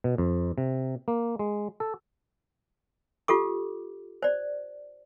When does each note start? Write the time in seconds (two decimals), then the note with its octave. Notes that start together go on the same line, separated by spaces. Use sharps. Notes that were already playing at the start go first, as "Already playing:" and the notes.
0.04 B2
0.18 F2
0.58 C3
1.08 A#3
1.39 G#3
1.80 A4
3.28 F4 G4 A4 D6
4.22 C5 D5